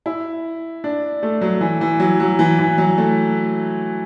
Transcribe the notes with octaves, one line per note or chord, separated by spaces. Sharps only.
E4
D4
A3
F#3
E3
E3
F#3
F#3
E3
E3
F#3
A3